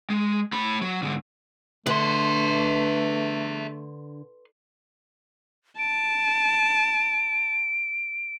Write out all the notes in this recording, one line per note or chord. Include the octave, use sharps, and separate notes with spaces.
G#3
A3 B5
F#3
G#2 D3
D3 A3 G#4 B4 E5 C6
A5 D7